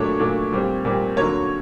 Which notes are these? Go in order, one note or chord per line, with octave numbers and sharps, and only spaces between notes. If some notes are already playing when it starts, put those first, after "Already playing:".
Already playing: A#2 F#3 A3 D4 C#5
A#2 F#3 A3 D4
A#2 G3 C4
A#2 G3 C4
D3 F#3 A#3 C#5